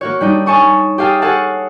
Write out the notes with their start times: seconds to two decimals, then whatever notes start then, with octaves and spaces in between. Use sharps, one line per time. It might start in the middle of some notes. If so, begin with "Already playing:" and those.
0.01 A#3 F#4 C#5
0.21 G3 D4 D#4
0.46 C#5 G#5 A5 C#6 D#6
0.98 G4 G#4 F5 G5 A5 D#6
1.22 G#4 A4 C#5 F5 F#5 A5